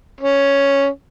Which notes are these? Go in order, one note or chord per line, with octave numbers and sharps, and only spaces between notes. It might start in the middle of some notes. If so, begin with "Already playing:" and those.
C#4